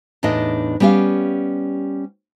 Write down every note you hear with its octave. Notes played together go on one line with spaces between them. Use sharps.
E2 A2 D4 D#4 D#5
G3 B3 C#4 G4 F5